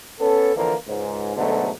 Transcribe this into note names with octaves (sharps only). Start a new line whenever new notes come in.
B3 C#4 A4
D3 E3 F3 A#3
C#2 G#2
G#2 B2 D3 F#3 A3